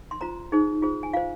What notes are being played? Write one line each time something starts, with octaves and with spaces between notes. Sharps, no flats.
C6
F4 C5 A#5
D#4 G#4 C5
F4 G#4 C5
G#5
F4 C5 F5